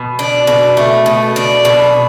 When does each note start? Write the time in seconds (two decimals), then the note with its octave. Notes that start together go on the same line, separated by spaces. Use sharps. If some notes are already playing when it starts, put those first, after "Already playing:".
Already playing: B2
0.19 D4
0.47 B2
0.77 A3
1.06 B2
1.36 D4
1.65 B2